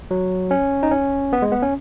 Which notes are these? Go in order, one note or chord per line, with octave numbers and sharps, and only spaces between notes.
F#3
C#4
D#4
C#4
B3
G#3
B3
C#4